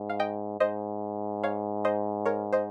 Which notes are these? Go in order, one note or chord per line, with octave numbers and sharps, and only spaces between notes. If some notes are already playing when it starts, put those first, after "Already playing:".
Already playing: G#2
F5
D#5 G5
G#2 C5 D#5
C#5 F5
C5 D#5
A#4 C#5
C5 D#5